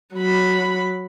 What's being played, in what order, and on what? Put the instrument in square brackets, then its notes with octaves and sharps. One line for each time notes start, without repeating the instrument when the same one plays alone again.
[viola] F#3 B5